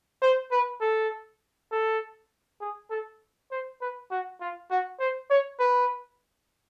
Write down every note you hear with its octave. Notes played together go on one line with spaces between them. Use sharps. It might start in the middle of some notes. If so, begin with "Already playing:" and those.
C5
B4
A4
A4
G#4
A4
C5
B4
F#4
F4
F#4
C5
C#5
B4